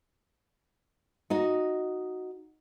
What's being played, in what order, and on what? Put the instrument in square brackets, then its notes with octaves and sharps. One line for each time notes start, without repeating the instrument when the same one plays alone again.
[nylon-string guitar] D#4 F#4 D#5